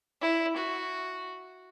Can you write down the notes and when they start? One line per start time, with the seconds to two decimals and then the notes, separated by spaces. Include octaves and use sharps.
0.21 E4
0.56 F#4